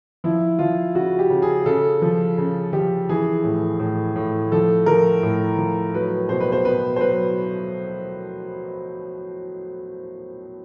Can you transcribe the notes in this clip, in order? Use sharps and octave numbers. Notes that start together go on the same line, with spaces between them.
F3 E4
F3 F4
C#3 F#4
G4
C#3
G#4
C#3 A4
F3
C#3
F3 G4
E3 G#4
A2
A2
A2
F3 A4
F3 A#4
A2
F3
F#3 B4
B2 C5
B4
C5
B2 B4
C5
F#3 B4